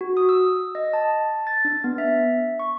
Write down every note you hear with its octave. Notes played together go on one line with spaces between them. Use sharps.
F#4
D#6
E6
D#5
A5
A6
D4
B3
E5
C#6